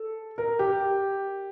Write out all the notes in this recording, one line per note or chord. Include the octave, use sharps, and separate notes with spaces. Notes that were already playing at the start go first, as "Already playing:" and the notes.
Already playing: A4
A#4
G4